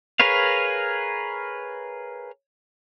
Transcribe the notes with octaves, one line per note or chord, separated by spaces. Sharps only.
G#4 A#4 B4 C#5 F5